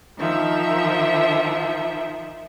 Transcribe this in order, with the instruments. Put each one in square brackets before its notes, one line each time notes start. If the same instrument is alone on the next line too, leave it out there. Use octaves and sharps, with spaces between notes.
[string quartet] D#3 F3 E5